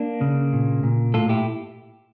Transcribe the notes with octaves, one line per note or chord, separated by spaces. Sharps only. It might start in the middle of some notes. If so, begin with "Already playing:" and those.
Already playing: A#3 D4
C#3
A#2
A#2
A2 F4 A4
E4 G4